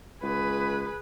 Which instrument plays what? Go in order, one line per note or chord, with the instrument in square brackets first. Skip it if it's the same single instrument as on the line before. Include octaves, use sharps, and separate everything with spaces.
[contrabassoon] C#2 [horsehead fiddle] G#4 B4